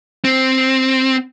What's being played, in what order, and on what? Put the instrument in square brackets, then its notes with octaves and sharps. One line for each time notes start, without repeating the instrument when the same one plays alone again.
[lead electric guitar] C4